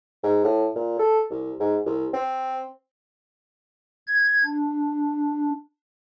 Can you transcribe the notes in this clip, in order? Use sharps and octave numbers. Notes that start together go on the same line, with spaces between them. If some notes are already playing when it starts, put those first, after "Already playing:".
G#2
A2
A#2
A4
C2
G#2
C2
C4
G#6
D4